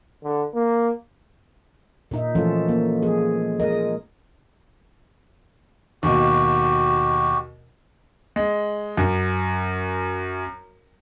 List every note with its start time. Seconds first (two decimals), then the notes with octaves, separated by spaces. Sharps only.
0.24 D3
0.54 A#3
2.11 A#2 D#4 E5
2.35 E3 F3 A3 C#4 F4 A4
2.69 A#3
3.02 F3 G#3 G#4
3.60 G#3 A#4 D#5
6.03 D#2 B2 F#4 G4
8.36 G#3
8.97 F#2